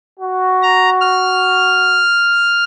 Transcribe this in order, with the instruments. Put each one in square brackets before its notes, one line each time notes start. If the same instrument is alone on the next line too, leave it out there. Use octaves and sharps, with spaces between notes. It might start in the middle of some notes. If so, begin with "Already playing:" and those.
[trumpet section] F#4
[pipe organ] A#5
F6